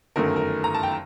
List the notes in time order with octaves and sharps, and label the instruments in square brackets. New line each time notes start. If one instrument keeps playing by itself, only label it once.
[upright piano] G1 F#2 D#3 A3 A#4
A#4
A#5
A5
G5